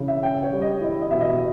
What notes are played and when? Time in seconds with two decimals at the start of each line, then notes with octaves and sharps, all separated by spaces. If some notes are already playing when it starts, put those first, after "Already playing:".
Already playing: C#3 E4
0.08 E5
0.23 C#4 G5
0.42 C#5
0.52 G3
0.62 D#5
0.81 E4 D#5
1.01 D#5
1.11 B2 E5
1.21 D#5